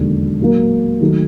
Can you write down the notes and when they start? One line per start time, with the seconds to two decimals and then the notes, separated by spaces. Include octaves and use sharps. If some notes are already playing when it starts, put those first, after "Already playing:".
Already playing: E1 D#2 D3 F#3
0.40 A#2 F#3 A#3
1.01 D#3 F#3 A3